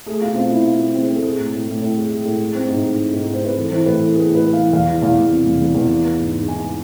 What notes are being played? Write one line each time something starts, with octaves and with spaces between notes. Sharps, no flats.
A3 G#4
B2 F4
C4 F4
B2 E4
B2 F4
C4
C4 G#4
C4
A4
G#3 G#4
A2
A2
A2
A2
G#3
G#3
A2
G#3
C4
G#2
G#2
G#3
G#2
G#2
C5
C4 B4
E3 A4
E3 C5
A2 B4
E3 A4
B3 G#4
A2
B4
B3
F5
E3
E2 F5
E3
E2 F5
E2
C3
E2
E2
E2
E3
B3
G#2
G#2
G#2 G#5